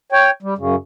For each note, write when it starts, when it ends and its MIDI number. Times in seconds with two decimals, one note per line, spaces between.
0.12 0.30 73
0.12 0.30 79
0.43 0.54 55
0.58 0.75 42
0.58 0.75 49